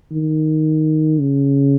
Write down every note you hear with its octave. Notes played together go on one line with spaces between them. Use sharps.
D#3
C#3